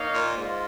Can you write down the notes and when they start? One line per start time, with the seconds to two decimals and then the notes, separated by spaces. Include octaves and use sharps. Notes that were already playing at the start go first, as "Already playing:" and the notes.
Already playing: A#3 D#4 C#5 F5
0.14 A#2
0.37 G#2 F4